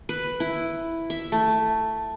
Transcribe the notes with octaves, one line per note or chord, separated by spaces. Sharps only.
B4
E4
E5
A3